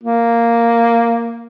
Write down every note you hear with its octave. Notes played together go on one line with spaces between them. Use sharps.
A#3